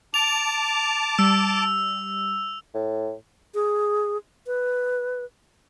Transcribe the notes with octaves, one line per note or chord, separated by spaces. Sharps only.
A5 D6 F7
G3 E6
A2
G#4
B4